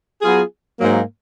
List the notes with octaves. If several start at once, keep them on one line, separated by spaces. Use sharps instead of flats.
F#3 B3 F4 G#4
G#2 F#3 A#3